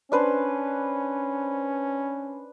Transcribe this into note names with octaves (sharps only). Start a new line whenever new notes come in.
C#4 D4 B4 C5